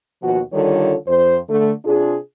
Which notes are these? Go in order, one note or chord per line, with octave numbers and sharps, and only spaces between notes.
D#2 B2 F3 F#4
D3 D#3 G3 F4 A4 C#5
F2 C5
D3 A3
C3 D4 F4 G#4